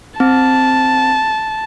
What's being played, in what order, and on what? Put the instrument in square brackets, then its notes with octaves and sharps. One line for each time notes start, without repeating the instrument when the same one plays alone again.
[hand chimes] C4 [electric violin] A5